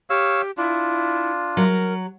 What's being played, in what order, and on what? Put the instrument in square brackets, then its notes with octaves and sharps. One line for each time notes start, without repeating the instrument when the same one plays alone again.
[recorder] G4 [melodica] C#5 F5 E6
[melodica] D4 F4 [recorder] E4
[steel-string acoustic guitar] F#3 [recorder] A#4